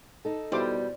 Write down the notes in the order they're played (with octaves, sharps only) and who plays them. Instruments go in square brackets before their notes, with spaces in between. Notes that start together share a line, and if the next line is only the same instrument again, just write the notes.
[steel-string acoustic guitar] D#4 A4
[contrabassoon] B2 [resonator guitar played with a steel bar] G3 [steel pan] E4 C5 D6